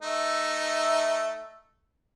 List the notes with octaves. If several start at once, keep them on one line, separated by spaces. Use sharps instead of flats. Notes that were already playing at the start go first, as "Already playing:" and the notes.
A3 D#4 E5